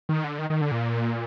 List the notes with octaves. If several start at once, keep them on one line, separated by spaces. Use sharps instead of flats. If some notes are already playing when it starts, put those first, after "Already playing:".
D#3
D3
D#3
D#3
D3
A#2